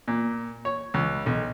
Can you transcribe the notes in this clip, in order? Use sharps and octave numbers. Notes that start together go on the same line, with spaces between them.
A#2
C#5
C#2
B1